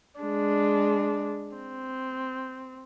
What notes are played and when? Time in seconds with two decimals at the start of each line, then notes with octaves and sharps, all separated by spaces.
0.20 G#3 D4
1.56 C4